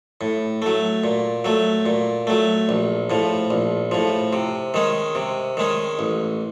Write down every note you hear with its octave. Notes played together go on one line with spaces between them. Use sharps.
A2
F#3 A3
A#2
F#3 A3
A#2
F#3 A3
A#1
A2 F3
A#1
A2 F3
C3
D#3 G#3 C#4
C3
D#3 G#3 C#4
A1